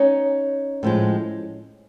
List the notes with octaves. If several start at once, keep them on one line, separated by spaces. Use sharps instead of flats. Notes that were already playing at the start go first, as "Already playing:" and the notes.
Already playing: C#4 D#4
A2 F3 G#3